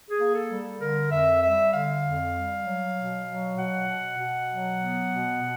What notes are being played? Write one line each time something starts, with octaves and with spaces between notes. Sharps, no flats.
G#4
A#3
A4
G3
D3 A#4
F2 E5
G3 E5
D3 F5
F2
G3
F#3
B2
F#3
B2 F#5
B2
B2
F#3
B3
B2
B2